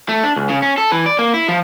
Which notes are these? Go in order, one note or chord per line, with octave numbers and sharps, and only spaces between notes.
A3
D4
C#2
C#3
C#4
A4
E3
D5
A#3
E4
F3